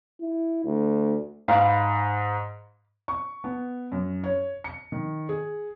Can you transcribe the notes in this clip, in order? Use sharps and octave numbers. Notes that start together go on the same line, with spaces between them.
E4
D2
G#2 F5 B5
C#6
B3
F#2
C#5
C#7
D#3
G#4